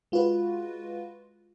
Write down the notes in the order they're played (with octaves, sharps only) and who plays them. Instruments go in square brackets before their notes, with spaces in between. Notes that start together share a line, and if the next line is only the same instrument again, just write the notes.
[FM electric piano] G#3 F4 F#4 B4